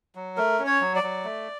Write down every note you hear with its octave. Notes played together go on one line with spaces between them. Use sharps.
F#3
A3 A#4
C#4
C#5
F#3
D5
F#3
A3